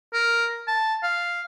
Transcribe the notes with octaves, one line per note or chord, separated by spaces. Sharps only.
A#4
A5
F5